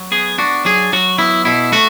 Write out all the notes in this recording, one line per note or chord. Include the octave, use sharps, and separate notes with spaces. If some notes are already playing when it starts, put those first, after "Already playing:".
Already playing: F#3
B3 G#4
D4 F#4
F#3 G#4
F#3 F#4
B3 E4
B2 E4
A3 F#4